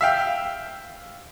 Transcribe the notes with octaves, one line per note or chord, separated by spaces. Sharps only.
E5 F5 G5